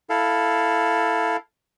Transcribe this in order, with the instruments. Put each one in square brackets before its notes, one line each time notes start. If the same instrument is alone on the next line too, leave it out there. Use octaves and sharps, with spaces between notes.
[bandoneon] E4 A4 F5